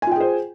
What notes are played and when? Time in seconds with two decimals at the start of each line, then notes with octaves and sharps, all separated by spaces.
0.02 G#5
0.07 F4
0.11 G5
0.16 G#4
0.20 C5